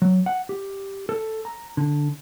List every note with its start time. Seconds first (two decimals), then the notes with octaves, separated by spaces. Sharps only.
0.02 F#3
0.26 F#5
0.49 G4
1.09 A4
1.45 A#5
1.77 D3